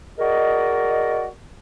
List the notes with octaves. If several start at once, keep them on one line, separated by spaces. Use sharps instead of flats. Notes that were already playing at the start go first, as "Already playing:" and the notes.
F#4 G#4 A#4 D5 D#5